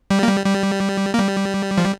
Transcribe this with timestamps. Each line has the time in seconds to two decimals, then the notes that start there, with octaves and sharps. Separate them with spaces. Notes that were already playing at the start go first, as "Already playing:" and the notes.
0.10 G3
0.23 A#3
0.28 G3
0.46 G3
1.14 A#3
1.19 G3
1.78 F3
1.85 G3